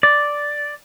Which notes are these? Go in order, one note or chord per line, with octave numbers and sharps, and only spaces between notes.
D5